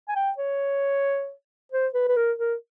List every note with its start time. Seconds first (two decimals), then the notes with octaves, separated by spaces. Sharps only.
0.09 G#5
0.16 G5
0.38 C#5
1.72 C5
1.94 B4
2.08 B4
2.17 A#4
2.39 A#4